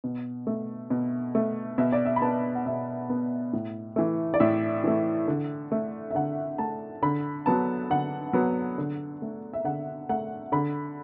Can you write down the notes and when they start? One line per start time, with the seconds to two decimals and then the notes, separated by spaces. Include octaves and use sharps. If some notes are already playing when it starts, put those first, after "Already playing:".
0.04 B2
0.47 A3
0.90 B2
1.35 A3
1.78 B2 E5
1.92 D5
2.05 E5
2.16 B5
2.22 B3 A5
2.55 F#5
2.66 B2 E5
3.10 B3
3.53 A2
3.96 E3 A3
4.34 D5
4.40 A2 E5
4.84 E3 A3
5.28 D3
5.72 A3
6.11 E5
6.15 D3 F#5
6.58 A3 A5
7.02 D3 B5
7.46 F#3 B3 A5
7.90 D3 F#5
8.33 F#3 B3
8.78 D3
9.22 A3
9.53 E5
9.64 D3 F#5
10.09 A3 F#5
10.52 D3 B5